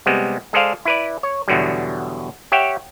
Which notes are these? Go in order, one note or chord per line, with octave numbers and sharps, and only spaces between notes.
C3 G3 G#3 B3
G#3 G#4 A4 C5 D5 F5
E4 B4 D5
C#5
E2 B2 D3 F#3 G3
G4 C#5 E5 F#5 G5